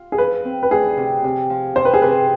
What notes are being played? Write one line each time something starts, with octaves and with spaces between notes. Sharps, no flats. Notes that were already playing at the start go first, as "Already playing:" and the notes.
Already playing: F4
G#4
F3 B4
C4
B4
D2 G#4
C3
C3
F3
C3 C5
B4
G#4
C3 B4